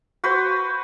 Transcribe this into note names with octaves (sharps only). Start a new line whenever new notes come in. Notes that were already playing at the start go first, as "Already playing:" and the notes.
F#4 B4 C5